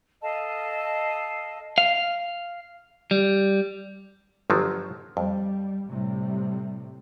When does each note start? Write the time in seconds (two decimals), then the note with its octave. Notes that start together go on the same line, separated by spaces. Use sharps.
0.22 A4 D#5 F5 A5
1.78 F5
3.11 G3
4.50 G1 F3 F#3
5.17 F2 G3
5.89 A2 C3 G3